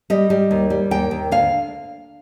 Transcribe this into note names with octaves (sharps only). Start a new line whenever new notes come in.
G3 D#5
G3
D#2
G3
D#2 G5
D#2
D2 F5